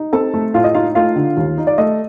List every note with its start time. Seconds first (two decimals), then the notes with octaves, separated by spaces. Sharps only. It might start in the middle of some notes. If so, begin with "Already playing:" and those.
Already playing: D#4
0.13 C4 A4 A5
0.34 A3
0.54 A2 F4 F5
0.64 D#5
0.75 D#4 F4 F5
0.95 A3 F4 F5
1.16 D3
1.37 D#2
1.58 D#4
1.67 D5
1.78 A3 D#5